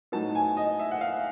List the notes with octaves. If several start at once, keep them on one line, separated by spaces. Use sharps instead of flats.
A2 F#3 B3 D#4 A5
G#5
D#5
E5
F#5
F5